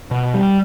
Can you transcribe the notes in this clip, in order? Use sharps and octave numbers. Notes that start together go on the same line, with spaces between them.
B2
G3